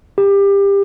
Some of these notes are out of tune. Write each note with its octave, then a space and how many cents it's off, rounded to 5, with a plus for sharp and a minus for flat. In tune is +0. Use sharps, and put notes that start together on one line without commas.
G4 +25